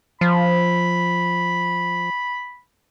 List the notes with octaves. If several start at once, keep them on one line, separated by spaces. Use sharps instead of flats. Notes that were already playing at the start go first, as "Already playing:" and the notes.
F3 B5